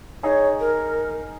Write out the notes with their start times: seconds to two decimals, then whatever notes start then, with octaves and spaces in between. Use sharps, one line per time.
0.23 D#4 G#4 C#5
0.60 A#4